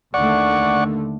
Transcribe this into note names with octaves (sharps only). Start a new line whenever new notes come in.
D#2 D3 A3 D5 F#5 C#6